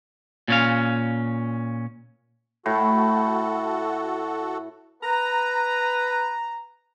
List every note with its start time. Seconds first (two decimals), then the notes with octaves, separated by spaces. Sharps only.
0.48 A#2 C#4 F5
2.66 A2 F#4 A4
5.02 B4 A#5